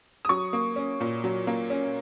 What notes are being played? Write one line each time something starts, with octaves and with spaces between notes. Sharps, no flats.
D#6
F#3 C#6
A#3
C#4
A#2
F#3
A#3
C#4